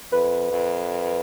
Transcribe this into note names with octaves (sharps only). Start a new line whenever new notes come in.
F2 B4
F2